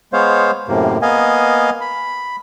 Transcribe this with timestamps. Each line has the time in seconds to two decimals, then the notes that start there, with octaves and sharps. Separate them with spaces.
0.13 G#3 B3 C5 C#5 F5
0.68 F#2 A2 C3 A#3
1.02 A#3 B3 D#5 F5 G#5
1.81 B5